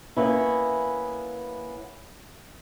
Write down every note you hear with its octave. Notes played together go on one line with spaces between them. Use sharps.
A#3 B3 C#4 E4